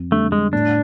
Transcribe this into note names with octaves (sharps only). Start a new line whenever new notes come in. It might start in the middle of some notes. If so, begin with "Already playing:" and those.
Already playing: F2
D3 G3 A3
G#3
A2 D4